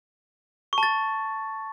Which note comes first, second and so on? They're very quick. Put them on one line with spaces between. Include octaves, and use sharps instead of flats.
C#6 A5 A6